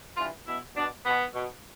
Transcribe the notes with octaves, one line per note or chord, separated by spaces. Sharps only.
G2 E3 F4
B2 E4
B2 D4
B2 B3
B2